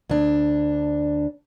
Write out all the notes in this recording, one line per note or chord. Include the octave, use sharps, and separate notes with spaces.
D2 D4